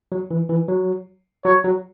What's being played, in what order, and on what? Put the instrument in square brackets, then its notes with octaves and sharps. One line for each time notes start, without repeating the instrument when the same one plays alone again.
[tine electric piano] F#3
E3
E3
F#3
[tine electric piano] F#3 [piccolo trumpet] C#5
[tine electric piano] F#3